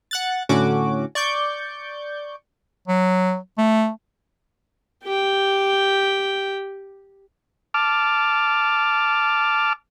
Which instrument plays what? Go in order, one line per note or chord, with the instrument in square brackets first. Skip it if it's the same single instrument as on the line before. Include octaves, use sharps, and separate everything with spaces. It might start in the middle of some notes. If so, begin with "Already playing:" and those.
[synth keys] F#5 F#6 A6
A2 D3 C#4 F#4 D6
D5 C#6 D6 G6
[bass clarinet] F#3
A3
[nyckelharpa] G4 G5
[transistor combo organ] A5 D6 F6